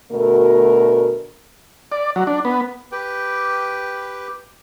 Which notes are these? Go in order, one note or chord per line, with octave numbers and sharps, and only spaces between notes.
D2 B2 A3 A#4
D5
F#3
D4
B3
G4 B4 G5